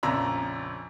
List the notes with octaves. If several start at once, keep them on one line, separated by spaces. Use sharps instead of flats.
A#1 F2 C#3 D5 A#5 E6